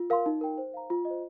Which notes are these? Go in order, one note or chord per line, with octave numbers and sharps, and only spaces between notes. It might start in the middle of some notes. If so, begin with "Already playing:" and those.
Already playing: F4
A#4 F5 C6
D#4
A#4 G5
C5
F5 A#5
F4
D#5
C5